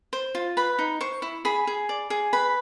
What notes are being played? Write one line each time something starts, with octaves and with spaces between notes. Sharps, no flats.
C5
F4
B4 B5
D#4
C5 C#6
E4
G#4 B5
G#4
D5
G#4
B4 B5